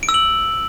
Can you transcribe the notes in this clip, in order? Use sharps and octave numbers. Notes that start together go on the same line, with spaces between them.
D7
E6
F#7